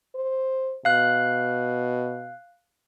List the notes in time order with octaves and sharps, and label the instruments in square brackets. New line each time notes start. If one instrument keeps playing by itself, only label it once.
[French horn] C5
[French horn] B2 [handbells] F5 F#6